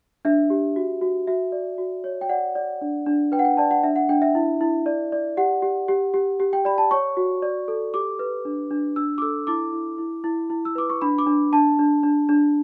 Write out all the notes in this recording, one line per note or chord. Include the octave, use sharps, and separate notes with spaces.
D4 E5
G4
F#4
F#4
F#4 E5
D5
F#4
C#5
G5
D5 F#5
D5
D4
D4
B4 G5
F#5
G5
D5 A5
F#5
D4 E5
F#5
D4 G5
E5
E4
E4
D5
D5
G4 F#5
G4
G4
G4
G4
G5
D5 B5
A5
C#5 C#6
F#4
D5
A4
G4 D6
B4
D4
D4
D4 E6
D6
A4 E6
E4 D6
E4
E4
E4
E4
E6
B4 D6
C#6
D4 B5
D6
D4
D4 A5
D4
D4
D4